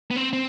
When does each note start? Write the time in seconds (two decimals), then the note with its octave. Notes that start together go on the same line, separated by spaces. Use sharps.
0.11 B3
0.16 C4
0.33 C4